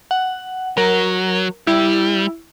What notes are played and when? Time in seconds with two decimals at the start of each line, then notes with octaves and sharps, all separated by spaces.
0.11 F#5
0.77 F#3 A#4
1.67 G3 E4